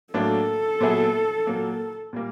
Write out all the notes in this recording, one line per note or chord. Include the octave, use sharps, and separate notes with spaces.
A2 F#3 A#3 D4 A4
A#2 F#3 B3 E4 G#4
A#2 F#3 A#3
A#2 G3 A#3